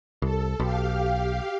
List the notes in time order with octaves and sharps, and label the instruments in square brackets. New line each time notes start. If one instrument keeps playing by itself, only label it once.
[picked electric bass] C2 [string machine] A4
[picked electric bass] B1 [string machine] G4 F5